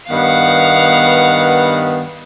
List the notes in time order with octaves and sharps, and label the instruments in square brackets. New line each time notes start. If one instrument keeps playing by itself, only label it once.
[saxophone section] G2 D#3 B3 [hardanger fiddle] F5 F#5